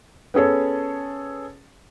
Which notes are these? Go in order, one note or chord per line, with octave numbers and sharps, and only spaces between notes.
B3 C#4 G#4 A4 C#5